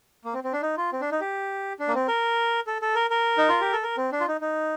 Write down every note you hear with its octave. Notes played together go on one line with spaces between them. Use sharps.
A#3
C4
C4
D4
D#4
F4
C4
D4
D#4
G4
D4
A#3
C4
A#4
A4
A4
A#4
A#4
D#4
F4
G4
A4
A#4
C4
D4
F4
D#4
D#4